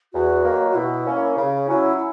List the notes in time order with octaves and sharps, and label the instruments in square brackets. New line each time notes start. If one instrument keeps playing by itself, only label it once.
[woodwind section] E2 [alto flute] F#4
[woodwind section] D#3 F#3 A#3
[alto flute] F#4
[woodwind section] B2 [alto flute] E4
[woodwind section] A#3 C#4
C#3
[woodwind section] F#3 C#4 [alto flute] E4
[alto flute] E4